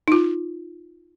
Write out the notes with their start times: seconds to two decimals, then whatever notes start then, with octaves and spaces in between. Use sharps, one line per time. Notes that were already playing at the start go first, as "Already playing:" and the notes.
0.08 D#4 F4